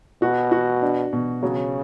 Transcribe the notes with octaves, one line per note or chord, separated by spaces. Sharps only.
B2 F#4
F#4
D4
B2
C#3 F#3